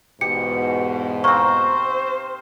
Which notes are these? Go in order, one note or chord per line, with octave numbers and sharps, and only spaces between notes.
E2 G#2 B2 G4 C#7
A#3 C4 C5 C#6